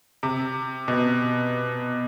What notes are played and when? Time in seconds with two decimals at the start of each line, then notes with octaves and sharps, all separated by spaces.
0.23 C3
0.88 B2